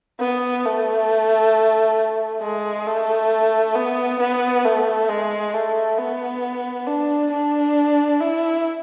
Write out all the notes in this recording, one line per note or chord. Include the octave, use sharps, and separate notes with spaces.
B3
A3
G#3
A3
B3
B3
A3
G#3
A3
B3
D4
D4
E4